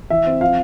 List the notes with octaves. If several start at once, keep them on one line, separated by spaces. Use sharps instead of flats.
E3 E5
C4
F3 F5